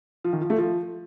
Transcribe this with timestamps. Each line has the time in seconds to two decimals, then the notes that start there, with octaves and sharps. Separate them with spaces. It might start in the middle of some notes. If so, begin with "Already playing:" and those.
0.24 F3
0.33 D#3
0.41 F3
0.50 A3
0.58 F3